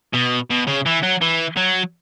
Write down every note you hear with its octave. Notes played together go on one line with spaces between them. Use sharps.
B2
B2
C#3
E3
F#3
E3
F#3